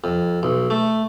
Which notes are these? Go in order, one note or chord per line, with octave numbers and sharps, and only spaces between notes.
F2
B1
A3